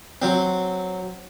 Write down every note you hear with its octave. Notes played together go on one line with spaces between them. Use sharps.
F#3 C4